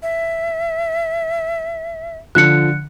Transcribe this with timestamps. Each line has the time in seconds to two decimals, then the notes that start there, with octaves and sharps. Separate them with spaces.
0.02 E5
2.35 D3 F3 F#6 C#7